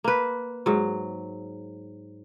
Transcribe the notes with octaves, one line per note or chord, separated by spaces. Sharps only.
A#3 B4
G#2 F#3